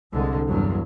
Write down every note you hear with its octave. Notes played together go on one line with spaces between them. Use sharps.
C2 D3 G#3
E2 G2 F#3